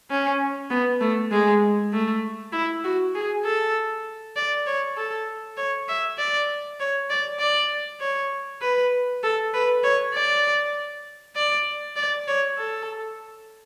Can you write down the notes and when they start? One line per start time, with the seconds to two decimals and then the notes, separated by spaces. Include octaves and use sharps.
0.10 C#4
0.70 B3
1.01 A3
1.31 G#3
1.93 A3
2.53 E4
2.84 F#4
3.15 G#4
3.45 A4
4.36 D5
4.67 C#5
4.96 A4
5.57 C#5
5.89 E5
6.18 D5
6.80 C#5
7.10 D5
7.40 D5
8.00 C#5
8.62 B4
9.23 A4
9.54 B4
9.84 C#5
10.14 D5
11.36 D5
11.96 D5
12.28 C#5
12.58 A4